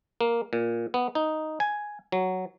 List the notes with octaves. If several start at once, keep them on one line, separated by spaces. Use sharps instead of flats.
A#3
A#2
B3
D#4
G#5
F#3